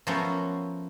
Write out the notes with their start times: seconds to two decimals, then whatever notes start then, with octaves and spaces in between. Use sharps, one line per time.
0.07 F3 F#3 A3 B3 C#4 A#4